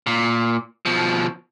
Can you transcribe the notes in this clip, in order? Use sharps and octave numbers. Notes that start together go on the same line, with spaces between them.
A#2
B2 F3